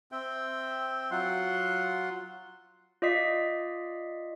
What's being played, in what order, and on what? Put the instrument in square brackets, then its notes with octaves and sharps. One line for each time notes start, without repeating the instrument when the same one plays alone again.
[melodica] C4 E5 G5
F#3 F4 F#5 C6
[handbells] F4 D5 D#5 D#6 B6 C7